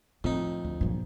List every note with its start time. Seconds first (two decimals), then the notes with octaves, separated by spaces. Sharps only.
0.24 F2 A2 C4 D#4
0.64 D2
0.81 G2 A#2 F3 F#3